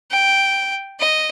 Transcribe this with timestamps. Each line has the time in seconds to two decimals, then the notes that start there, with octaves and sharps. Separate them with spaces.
0.11 G5
0.99 D#5